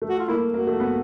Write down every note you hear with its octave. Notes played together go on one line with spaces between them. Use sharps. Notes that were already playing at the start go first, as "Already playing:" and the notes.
A3
F#4
F4
A#3 E4
A#3 F#4
A3
B3